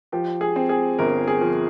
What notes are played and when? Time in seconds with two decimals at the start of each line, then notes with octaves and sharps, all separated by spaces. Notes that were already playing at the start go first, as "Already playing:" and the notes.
0.12 F3 G4
0.41 G#4
0.56 C4
0.69 G#4
0.99 G1 A#4
1.28 G#4
1.41 F3